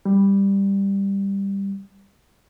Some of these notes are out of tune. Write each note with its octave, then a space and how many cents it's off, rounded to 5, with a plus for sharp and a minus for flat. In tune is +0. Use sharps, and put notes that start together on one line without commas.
G3 +10